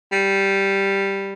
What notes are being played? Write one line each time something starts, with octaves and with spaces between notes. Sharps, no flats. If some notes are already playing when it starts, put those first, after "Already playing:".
G3